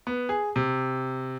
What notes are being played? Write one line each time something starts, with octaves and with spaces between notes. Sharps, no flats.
B3
G#4
C3